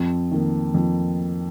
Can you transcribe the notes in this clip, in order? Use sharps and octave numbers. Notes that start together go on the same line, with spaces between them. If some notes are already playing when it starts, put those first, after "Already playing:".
Already playing: F2
D#3 A#3
F2